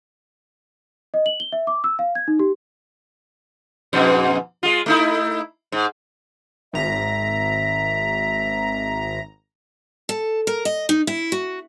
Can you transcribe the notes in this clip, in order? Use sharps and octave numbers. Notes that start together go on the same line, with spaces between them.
D#5
F#7
G7
E5
D6
E6
F5
G#6
D#4
G4
F2 G#2 B2
G#3 F4
A3 D#4 E4
G#2
G#1 E5 A#5
A4
A#4
D#5
D#4
E4
F#4